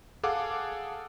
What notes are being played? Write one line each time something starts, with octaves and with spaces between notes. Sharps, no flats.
G#4 A4 F5 F#5 A5 D6